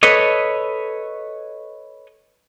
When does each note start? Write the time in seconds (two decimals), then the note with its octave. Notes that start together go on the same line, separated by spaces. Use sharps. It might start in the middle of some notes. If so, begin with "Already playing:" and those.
0.03 A4 B4 C#5 D#5